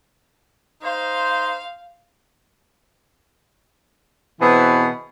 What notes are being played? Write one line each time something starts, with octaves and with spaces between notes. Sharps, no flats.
D#4 C5 F5
B2 E3 C4 G#4 B4